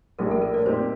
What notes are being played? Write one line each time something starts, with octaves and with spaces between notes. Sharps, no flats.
A#1 A2 G3 A#4
A4
A#4
D5
A#2 G3 C4 D#4 G4 C5